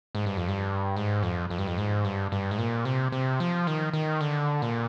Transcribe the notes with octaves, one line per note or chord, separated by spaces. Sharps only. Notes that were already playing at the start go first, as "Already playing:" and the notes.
G#2
G2
F2
G2
G#2
F2
F2
G2
F2
G#2
G2
G2
G#2
A#2
C3
C3
F3
D#3
D#3
D3
A#2